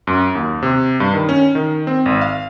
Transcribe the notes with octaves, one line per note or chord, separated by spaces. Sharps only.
F#2
D#2
C3
G2
D#3
C#4
D#3
C4
G#1
F5